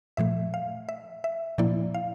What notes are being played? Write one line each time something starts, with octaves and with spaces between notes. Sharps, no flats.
A#2 F3 A3 E5
F5
E5
E5
A#2 F3 A#3 E4 D5
F5